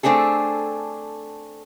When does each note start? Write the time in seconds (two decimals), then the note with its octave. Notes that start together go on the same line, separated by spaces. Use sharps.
0.03 A3 C4 D4 G#4 A4